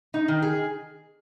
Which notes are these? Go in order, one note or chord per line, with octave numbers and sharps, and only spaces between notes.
D#4
D#3
G#4